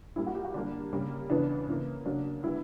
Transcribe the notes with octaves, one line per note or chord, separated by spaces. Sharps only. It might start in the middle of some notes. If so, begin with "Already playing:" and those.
A#2 G3 A#3 E4
F#4
G4
F#4
D3 G3 A#3 D4
C#3 G3 A#3
C#3 E3 B3 D4
C#3 E3 A#3
C#3 F#3 A#3 D4
D3 G3 B3 E4